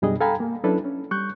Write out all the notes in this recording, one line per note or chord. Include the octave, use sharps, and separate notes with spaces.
F#2 B2 G3 D4 G#4 D#5
A4 F5 G5 G#5 A#5 B5
A#3
F#3 C#4 D4 E4 A4 B4
C#4
G3 C#6 F#6 G6